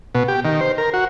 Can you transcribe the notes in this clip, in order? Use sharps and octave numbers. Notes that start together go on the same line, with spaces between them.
B2
G4
D#3
C5
A#4
F#4